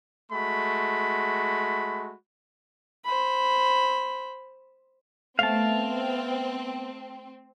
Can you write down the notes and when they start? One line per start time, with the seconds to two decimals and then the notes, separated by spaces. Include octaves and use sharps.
0.31 G#3 A3 F#4 B5
3.05 C5 B5
5.39 A3 B3 C4 F5 A5